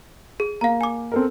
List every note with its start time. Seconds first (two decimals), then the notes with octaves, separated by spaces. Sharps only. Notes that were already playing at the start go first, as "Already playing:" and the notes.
0.40 G#4
0.61 A#3 F5 A#5
0.81 G#5 D6
1.12 C4 A4 A#4